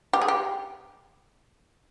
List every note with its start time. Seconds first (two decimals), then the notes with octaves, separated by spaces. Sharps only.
0.13 G4
0.21 G#4
0.28 G4